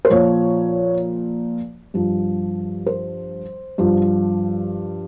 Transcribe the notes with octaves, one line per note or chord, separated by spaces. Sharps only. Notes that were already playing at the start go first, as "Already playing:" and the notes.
C5
A#2 F3 C#5
G2 F3
C5
G2 F3